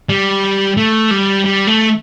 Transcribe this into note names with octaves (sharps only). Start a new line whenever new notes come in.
G3
A3
G3
G3
A3